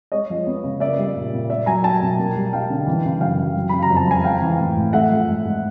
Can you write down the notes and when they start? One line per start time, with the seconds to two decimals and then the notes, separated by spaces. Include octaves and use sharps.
0.12 G#3 C#5 D#5
0.30 F3
0.47 B3
0.64 C#3
0.80 A#3 D5 E5
0.98 G3
1.16 A#2
1.33 A#2
1.50 A#3 D5 E5
1.66 F#3 G#5 A#5
1.83 D#4 G5 A5
2.02 B2
2.19 A#3
2.36 G3
2.53 D#4 F5 G5
2.70 D3
2.87 E3
3.05 C#3
3.21 F#2 F5 G5
3.39 F#2
3.56 F#3
3.69 C#3 B5
3.83 A#5
3.90 F2
3.97 A5
4.07 F2 G#5
4.24 G#3 F5 G5
4.42 E3
4.59 A2
4.77 A2
4.93 A3 E5 F#5
5.11 F3
5.28 G#2
5.44 G#2